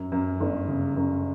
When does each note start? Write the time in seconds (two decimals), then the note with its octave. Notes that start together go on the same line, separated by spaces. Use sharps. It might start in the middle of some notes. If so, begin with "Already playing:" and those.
Already playing: F#2
0.12 F#2
0.41 G1
0.68 C#3
0.97 F#2